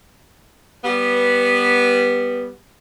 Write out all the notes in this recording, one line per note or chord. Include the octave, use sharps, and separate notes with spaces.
G3 B3